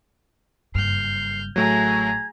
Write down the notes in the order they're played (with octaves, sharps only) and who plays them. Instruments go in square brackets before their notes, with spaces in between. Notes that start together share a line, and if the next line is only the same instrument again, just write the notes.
[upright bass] F#1 G2 [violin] F6 G6 [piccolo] C7
[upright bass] A1 [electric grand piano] F#3 A3 [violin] G#4 A#5 [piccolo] G#6